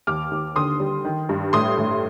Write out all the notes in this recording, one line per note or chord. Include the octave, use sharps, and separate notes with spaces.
D#2 D6 F6
D#2
D3 C6 D#6
G3
D#3
G2
A2 C6 D#6
A2